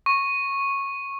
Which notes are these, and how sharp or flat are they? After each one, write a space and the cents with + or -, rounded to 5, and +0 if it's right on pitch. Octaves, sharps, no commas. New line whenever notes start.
C#6 -15